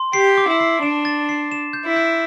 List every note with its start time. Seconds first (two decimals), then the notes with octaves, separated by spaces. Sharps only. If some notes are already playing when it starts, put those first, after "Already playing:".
Already playing: C6
0.13 G4 C7
0.37 D6
0.48 E4
0.60 C7
0.82 D4 E7
1.05 A6
1.29 C7
1.52 E7
1.73 G6
1.85 E4
1.96 G6